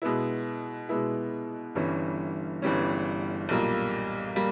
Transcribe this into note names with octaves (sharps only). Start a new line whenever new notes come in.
B2 G#3 B3 E4
B2 G#3 B3 E4
G1 G2 E3 G3 C#4
G1 G2 E3 G3 C#4
B1 A#2 G3 A#3
G3 A#3